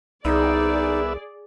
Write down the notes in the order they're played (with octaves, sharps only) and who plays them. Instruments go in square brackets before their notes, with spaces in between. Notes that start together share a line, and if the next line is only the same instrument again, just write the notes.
[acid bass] C2 [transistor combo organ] B3 E5 [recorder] D#4 [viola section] G#4 D5